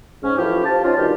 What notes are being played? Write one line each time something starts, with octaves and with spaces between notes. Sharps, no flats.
G#2 C#4
E3 F3 A3 E4 F4 G4
G4 C5 F5 A5
C4 C#4 D#4 F4
B2 D#3 G3 D4 F4 G4